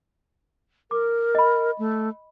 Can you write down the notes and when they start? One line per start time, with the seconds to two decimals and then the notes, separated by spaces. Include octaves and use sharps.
0.91 A#4 D6
1.35 D#5 B5
1.79 A3